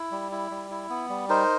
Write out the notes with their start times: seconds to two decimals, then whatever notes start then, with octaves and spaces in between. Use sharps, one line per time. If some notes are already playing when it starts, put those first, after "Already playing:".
Already playing: E4
0.11 G3
0.32 E4
0.51 G3
0.71 E4
0.90 B3
1.10 G3
1.29 D#4 A#4 C5